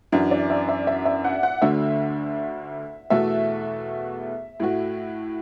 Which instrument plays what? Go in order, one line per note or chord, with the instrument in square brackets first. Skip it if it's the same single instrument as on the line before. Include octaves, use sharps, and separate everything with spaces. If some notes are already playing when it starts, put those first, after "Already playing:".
[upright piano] F#2 E3 D4 F#4 [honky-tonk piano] E5
[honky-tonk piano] D5
E5
E5
E5
E5
F#5
F#5
[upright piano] D2 D3 A3 D4 F#4 [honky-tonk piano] E5
[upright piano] E2 B2 A3 F#4 A4 [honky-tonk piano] E5
[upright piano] A2 A3 F#4